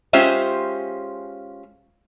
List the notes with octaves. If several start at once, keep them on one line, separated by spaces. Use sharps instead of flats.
G#3 C#4 F4 G4 C5 E5